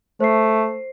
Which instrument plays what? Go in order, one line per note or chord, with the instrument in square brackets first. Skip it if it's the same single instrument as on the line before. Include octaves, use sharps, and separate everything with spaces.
[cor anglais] A3 [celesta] C5 C7